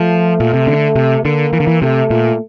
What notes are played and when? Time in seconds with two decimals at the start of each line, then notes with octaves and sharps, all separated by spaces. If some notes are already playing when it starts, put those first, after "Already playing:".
Already playing: F3 A3
0.40 A#2
0.54 C3
0.67 D3
0.96 C3
1.24 D3 A#3
1.53 E3
1.60 D3
1.67 E3
1.82 C3 A3
2.10 A#2